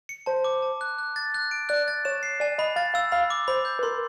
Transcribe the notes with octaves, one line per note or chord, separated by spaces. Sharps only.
C#7
C5 A5
D6
A5
F#6
F#6
A6
F#6
D7
D5 F#6
A6
C#5 E7
C7
D5 G#5
D#5 B5
F5 A6
F5 E6
F5 B5
D6
C5 B5
G6
B4
A#4 C6